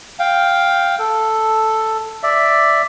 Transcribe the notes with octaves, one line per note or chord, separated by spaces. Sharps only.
F5 G5
A4
D5 E5